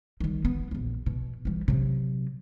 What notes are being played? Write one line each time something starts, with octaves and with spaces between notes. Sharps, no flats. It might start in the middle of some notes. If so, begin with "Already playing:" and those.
D#3 G3
B3
A#1 E2
B2
E3 G3
C3 F#3